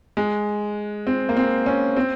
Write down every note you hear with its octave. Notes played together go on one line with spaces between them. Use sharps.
G#3
C4
A#3
C4
C#4
C4